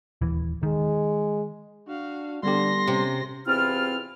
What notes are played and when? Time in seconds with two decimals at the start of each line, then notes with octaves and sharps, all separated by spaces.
0.21 D#1 E3
0.63 D#3 G#3
1.88 D4 F#4 F5
2.43 D3 G3 B3 G4 C6 A#6
2.88 C3 C#4
3.47 E2 C3 C4 E4 F4 F6